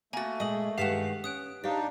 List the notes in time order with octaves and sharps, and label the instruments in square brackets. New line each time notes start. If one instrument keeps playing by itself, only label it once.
[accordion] A3 [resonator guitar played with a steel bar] A#3 F#4 [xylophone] G#5 A6
[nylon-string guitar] A#2 G#3 [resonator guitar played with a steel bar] D#5 [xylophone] D#6 F#7
[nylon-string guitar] G2 D#3 G#3 [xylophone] G4 B6 E7 [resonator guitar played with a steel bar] F5 F#5
[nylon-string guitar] C#4 [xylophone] D#6 F#6 D7
[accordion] D4 D#4 [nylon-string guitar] G4 C5 F5 [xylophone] D5